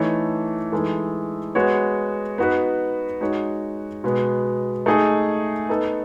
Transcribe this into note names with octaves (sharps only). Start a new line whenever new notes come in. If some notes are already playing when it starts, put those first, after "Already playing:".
Already playing: E3 A3 D#4 A4 C#5
E3 G#3 D#4 A4
G#3 B3 F#4 C#5
B3 D#4 F#4 B4
G#3 D#4 F#4 C#5
B2 G#3 B3
A3 D#4 G#4 D#5
B3 D#4 A4